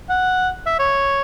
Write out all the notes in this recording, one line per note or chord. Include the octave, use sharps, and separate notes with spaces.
F#5
E5
C#5